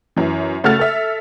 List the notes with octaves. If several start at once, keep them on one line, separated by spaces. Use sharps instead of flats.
F#2 E3
C#3 A3 F#4 A4 F6 A6
A4 E5